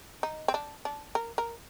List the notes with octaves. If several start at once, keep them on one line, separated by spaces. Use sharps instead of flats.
D#4
C4
D4
D4
A#4
A#4